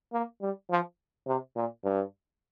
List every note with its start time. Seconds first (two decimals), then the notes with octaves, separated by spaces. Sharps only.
0.13 A#3
0.42 G3
0.70 F3
1.27 C3
1.56 A#2
1.84 G2